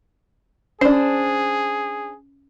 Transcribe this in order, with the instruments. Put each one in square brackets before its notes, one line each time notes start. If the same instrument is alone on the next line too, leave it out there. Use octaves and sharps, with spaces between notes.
[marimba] C#4 [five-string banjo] D4 C5 [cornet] G#4